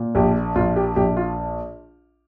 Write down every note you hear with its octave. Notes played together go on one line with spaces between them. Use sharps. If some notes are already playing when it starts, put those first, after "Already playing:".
Already playing: A#2
A#1 G4
A#1 F4
G4
A#1 G4
F4